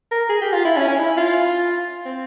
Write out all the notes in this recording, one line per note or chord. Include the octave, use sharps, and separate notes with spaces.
A#4
G#4
G4
F4
E4
C#4
C#4
E4
F4
C4